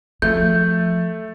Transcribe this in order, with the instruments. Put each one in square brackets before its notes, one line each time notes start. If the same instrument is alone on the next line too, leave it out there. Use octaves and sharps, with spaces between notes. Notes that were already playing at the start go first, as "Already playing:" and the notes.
[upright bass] F3 [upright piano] A3 [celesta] G6